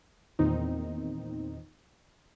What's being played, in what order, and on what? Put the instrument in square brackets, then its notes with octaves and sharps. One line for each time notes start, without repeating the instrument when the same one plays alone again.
[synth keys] E2 A#2 D#3 C4 D#4